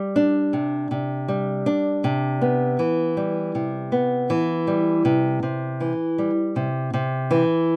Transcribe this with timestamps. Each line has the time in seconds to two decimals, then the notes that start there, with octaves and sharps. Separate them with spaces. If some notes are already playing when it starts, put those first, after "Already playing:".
Already playing: G3
0.16 D4
0.53 C3
0.91 C3
1.28 G3
1.66 D4
2.04 C3
2.41 B3
2.79 E3
3.17 G3
3.55 C3
3.92 B3
4.30 E3
4.67 G3
5.05 C3
5.43 C3
5.80 E3
6.18 G3
6.56 C3
6.94 C3
7.31 E3